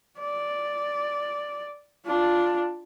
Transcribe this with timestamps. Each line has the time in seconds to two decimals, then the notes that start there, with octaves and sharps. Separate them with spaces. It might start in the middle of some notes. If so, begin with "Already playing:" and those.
0.19 D5
2.05 D4 F4